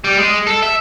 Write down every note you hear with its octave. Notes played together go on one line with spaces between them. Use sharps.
G3
G#3
A4
E5